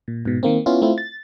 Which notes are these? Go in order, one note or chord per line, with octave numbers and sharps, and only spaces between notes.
A#2
G#2 B2
D#3 A#3 C4
B3 C#4 E4 F4
A3 C4 E4 F4
A6